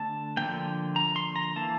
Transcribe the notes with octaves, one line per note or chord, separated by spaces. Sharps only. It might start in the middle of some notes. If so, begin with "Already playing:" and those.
Already playing: D3 A3 A5
D3 F3 A#3 G5
A#5
C6
A#5
E3 A#3 A5